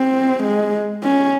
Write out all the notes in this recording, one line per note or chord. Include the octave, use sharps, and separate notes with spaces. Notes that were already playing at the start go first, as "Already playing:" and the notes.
Already playing: C4
G#3
C#4